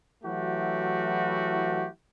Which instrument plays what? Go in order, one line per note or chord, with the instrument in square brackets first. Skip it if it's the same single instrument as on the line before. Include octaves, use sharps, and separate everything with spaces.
[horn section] E3 F#3 A3 E4 F#4 G4